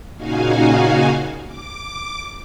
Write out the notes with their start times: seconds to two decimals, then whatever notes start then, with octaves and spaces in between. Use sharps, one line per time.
0.16 A#2 C#3 D#4 F#4 F5 G#5
1.46 D6